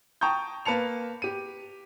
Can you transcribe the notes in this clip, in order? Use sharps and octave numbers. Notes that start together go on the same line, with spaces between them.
G5 A5 A#5 C#6 D#6 G6
A#3 B4 A5 C#7 F7
G4 D#7